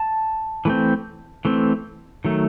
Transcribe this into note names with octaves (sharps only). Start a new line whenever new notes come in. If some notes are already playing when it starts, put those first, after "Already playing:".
Already playing: A5
E3 A3 C4
E3 A3 C4
D#3 F#3 A3